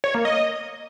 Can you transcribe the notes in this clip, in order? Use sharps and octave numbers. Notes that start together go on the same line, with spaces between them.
C#5
A#3
D#5